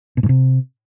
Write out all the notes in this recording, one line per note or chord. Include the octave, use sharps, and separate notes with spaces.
B2
G#2
C3